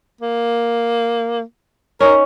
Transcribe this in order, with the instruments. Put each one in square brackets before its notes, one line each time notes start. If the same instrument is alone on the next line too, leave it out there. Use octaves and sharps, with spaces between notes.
[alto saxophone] A#3
[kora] C#4 D#4 [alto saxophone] A#4